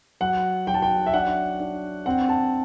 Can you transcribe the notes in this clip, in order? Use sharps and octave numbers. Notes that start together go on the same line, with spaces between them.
F#3 F#5
F#3 G5
A5
G5
E5
D4 F#5
D4
C4 F#5
A5